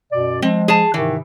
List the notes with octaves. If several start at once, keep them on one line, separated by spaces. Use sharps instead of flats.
F#2 B2 D5
F3 G#3 C4
G#4 A5
G#2 C3 D#3 E3